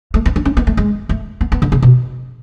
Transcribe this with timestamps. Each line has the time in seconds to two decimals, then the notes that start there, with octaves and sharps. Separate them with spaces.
0.14 A3
0.26 B3
0.36 D4
0.45 C#4
0.57 B3
0.67 A3
0.77 G#3
1.09 A3
1.41 B3
1.52 B3
1.62 D3
1.72 C#3
1.82 B2